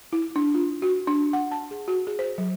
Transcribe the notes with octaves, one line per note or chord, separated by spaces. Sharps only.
E4
D4
F4
F#4
D4
F#5
A5
G#4
F#4
G#4
C5
F#3